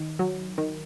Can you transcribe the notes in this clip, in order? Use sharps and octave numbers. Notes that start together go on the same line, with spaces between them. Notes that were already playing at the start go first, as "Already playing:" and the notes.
Already playing: D#3
F#3
D#3